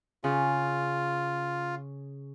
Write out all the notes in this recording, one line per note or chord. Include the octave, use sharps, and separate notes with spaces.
C#3 F4